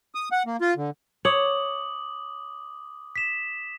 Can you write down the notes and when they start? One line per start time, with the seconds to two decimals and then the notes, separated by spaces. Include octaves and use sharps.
0.15 D#6
0.32 F#5
0.46 A#3
0.61 F4
0.77 D3
1.25 C#5 D6 D#6 F#7
3.16 B6 E7